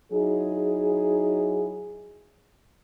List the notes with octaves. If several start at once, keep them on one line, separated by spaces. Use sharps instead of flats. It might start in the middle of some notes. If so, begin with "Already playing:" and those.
F#3 D#4 E4 G#4